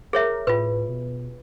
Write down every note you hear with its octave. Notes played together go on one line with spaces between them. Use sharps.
G#4 A#4 C#5 E5
A2 F4 B4
B2